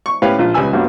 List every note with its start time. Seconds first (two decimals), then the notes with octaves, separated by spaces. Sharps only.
0.06 C#6
0.22 A2 C#4 G4 B4 F5
0.39 A#1 F4
0.54 C#2 G3 B4 G#5 E6
0.73 G2 F#3 A#3 B3